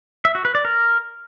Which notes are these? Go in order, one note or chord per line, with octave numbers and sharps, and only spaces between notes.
E5
F#4
B4
D5
A#4